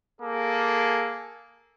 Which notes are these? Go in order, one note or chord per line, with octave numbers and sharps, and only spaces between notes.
A#3 G#4 A4